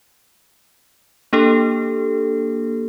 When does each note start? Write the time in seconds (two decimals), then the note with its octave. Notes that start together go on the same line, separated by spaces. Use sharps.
1.33 A#3 D4 G4 A4